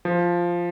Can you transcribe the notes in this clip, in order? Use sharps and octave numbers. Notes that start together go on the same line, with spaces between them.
F3